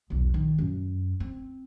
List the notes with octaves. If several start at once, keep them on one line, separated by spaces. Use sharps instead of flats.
B1 E2
D#3 F3
F#2
C4